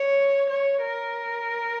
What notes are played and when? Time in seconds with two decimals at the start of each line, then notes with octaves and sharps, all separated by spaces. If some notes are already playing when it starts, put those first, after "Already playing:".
Already playing: C#5
0.50 C#5
0.82 A#4